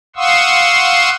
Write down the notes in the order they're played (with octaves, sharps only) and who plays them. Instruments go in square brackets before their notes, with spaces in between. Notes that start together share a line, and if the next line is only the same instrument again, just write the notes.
[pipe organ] F5 F#5 C6 C#6 D#6 E6